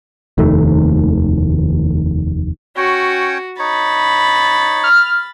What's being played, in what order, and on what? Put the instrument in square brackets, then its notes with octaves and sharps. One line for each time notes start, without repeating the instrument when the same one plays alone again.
[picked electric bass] F1 D#2 D#3 A3
[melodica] C#4 C#5 G5 [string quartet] F#4
[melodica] D#4 C#5 [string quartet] B5 A6
[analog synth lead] F6